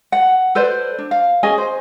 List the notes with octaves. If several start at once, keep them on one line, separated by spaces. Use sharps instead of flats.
F#5
A4 B4 C5 D5
D4
F5
C#4 G#4 D#5 G#5
C5